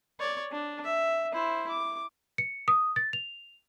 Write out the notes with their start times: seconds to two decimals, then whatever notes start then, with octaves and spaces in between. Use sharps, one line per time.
0.20 C#5 D5
0.52 D4
0.84 E5
1.32 E4 C5
1.69 D6
2.38 C#7
2.68 D#6
2.96 A6
3.13 F7